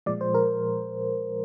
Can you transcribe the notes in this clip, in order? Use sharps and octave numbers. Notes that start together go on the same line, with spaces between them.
A#2 F3 G#3 D5
C5
A#4